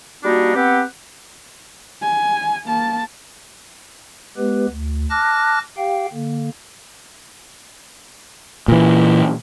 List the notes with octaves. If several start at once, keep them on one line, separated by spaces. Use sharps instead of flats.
G3 A#3 D4 D#4 F#4
B3 C4 G4 F#5
G#5
A#3 A5
G#3 B3 G4 B4
D2
A5 D6 F6 F#6 A#6
G4 F5 G5
D3 A#3
A#2 E3